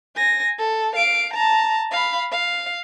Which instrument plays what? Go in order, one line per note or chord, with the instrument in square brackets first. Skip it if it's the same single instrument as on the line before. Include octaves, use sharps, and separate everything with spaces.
[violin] G#5 A#6
A4
F5 D7
A5 A#5
F5 B5
F5